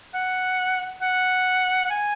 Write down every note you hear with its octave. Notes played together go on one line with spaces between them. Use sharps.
F#5
F#5
F#5
G#5